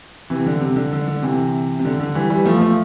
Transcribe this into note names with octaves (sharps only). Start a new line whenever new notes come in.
C3 E3
D3
C3
D3
D3
D3
C3 E3
C3
D3
D3
E3 G3
E3 G3
F3 A3
F3 A3